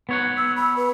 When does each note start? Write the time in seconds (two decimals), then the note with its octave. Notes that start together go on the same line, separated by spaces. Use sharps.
0.09 B3 C#5 F#5
0.37 E6
0.56 B5
0.76 B4